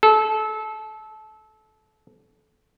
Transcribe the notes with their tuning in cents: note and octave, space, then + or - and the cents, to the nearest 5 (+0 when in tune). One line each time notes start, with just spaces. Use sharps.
A4 -25